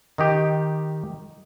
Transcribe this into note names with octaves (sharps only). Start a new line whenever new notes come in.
D#3 D#4 G4